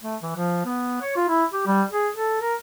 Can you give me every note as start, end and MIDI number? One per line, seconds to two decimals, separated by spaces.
0.03 0.16 57
0.22 0.32 52
0.36 0.61 53
0.65 0.98 59
1.01 1.13 73
1.16 1.28 65
1.28 1.44 64
1.52 1.64 67
1.66 1.83 55
1.91 2.08 68
2.14 2.37 69
2.40 2.54 70